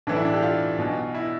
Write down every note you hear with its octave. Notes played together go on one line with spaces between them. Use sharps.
B1 A2 E3 D4
E4
D4
G4
F4
B1 B2
E4